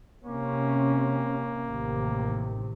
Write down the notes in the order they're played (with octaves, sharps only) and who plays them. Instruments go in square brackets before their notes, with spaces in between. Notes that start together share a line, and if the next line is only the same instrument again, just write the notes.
[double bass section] C3 C#4 [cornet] A#3
[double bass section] A1 C3 D#3